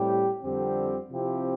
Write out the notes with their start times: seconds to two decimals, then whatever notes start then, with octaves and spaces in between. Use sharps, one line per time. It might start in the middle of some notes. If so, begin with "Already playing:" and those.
Already playing: A2 G3 C4 G4
0.43 F2 D3 G3 C4 G4
1.11 C3 F3 C4 E4 G4